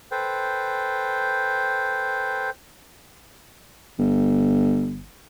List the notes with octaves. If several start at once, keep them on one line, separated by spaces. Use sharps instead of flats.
A4 B4 C5 G5
G1